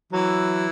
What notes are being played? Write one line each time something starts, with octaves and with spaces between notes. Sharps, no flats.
E3 F#3 E4